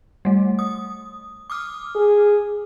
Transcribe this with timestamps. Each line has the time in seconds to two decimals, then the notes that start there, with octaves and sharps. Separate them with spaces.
0.25 G3 A3
0.59 D#6
1.50 D6 D#6 F6
1.96 G#4